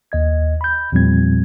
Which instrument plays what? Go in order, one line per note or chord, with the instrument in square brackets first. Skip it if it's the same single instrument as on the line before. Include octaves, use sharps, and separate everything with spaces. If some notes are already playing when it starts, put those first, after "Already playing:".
[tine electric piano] D#2 D#5 G#6
B5 G6
E2 A#2 F3 G3 C4 G#6